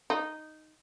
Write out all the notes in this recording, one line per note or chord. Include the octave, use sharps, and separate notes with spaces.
D#4